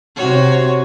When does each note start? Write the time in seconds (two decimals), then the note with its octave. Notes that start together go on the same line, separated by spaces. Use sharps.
0.16 C3 F#4 C#5